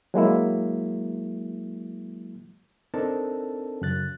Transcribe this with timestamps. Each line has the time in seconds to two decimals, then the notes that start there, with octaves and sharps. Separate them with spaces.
0.14 F#3 G#3 A#3 E4
2.94 C4 D4 D#4 A4 A#4 A5
3.82 F#2 C#3 F#6 A6